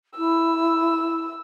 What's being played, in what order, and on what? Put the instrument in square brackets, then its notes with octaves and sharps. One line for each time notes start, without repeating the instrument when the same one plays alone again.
[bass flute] E4 [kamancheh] E6